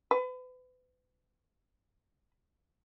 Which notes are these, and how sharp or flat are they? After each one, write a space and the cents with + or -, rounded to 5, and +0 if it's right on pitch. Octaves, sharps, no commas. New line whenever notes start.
B4 +35